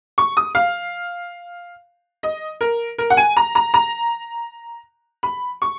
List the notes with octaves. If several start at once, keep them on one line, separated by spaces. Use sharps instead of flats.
C#6
D#6
F5
D#5
A#4
A#4
F#5
G#5
A#5
A#5
A#5
B5
C#6